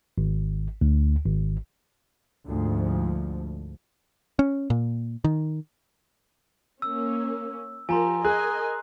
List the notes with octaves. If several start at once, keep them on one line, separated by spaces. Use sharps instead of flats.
G#1
D2
G#1
D2 G#2 F3
C#4
A#2
D#3
A#3 C#4 E6
F3 G4 A#4 G#5 A#5 C6
G#4 A#4 D#5 G#5 F#6